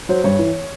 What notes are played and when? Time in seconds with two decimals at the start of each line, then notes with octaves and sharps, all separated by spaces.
0.09 F#3 C5
0.24 G2 C#5
0.39 E3